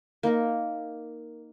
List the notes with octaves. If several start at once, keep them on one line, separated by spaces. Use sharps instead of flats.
A#3 D#4 A#4